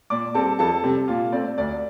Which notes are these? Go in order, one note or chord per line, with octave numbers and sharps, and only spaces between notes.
A#2 D5 D6
G3 C4 A4 A5
F2 A4 A5
C3 G3 C4
A#2 F4 F5
A3 C4 D5
D2 D5